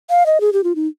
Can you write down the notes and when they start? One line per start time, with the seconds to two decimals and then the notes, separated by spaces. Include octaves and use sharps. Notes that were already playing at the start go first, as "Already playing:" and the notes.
0.10 F5
0.26 D#5
0.41 G#4
0.53 G4
0.64 F4
0.75 D#4